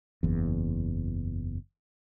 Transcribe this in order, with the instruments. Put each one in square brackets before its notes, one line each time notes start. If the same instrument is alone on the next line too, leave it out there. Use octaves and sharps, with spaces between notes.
[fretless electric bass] F#1 E2